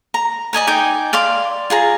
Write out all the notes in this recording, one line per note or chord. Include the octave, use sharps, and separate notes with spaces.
A#5
D5 D#5 G#5 A#5
D#4 G5 G#5 D6
D5 F5 C6 D6
F4 G#4 A#5